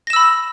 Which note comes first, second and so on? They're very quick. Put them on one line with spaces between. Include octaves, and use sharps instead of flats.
A#6 E7 E6 B5